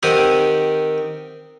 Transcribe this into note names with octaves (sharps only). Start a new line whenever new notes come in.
D#3 C4 G4 F#5 D#6